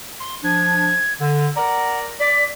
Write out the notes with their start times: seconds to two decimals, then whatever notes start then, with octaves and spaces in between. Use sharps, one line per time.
0.20 C6
0.44 F3 D4 G#6
1.19 D3
1.57 A#4 D5 F#5 A#5
2.20 D5 B6